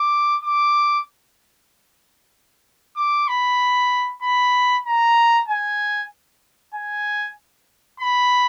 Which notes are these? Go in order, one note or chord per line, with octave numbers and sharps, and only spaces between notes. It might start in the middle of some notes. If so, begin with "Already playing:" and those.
Already playing: D6
D6
D6
B5
B5
A#5
G#5
G#5
B5